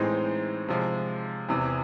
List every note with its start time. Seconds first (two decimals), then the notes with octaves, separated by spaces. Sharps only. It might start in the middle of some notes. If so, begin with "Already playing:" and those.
Already playing: A2 E3 G#3 C4 D#4
0.69 C3 F3 G#3
1.49 E2 C3 E3